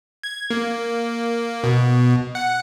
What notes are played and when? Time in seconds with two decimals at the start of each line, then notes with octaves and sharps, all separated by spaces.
0.23 G#6
0.50 A#3
1.64 B2
2.35 F#5